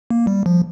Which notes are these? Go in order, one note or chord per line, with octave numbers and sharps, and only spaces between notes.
A#3
G3
F3